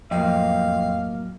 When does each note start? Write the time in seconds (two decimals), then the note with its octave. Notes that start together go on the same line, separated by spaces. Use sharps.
0.11 F2 A2 F#3 A#3 D#5 F5 G5